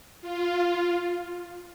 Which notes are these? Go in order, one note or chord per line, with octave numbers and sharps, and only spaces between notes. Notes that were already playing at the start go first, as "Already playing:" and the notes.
F4